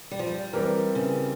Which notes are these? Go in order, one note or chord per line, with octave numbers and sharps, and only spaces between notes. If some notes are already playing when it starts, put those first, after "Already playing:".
G3
F3
G3
E3 G3 C4 G4 A#4
C#3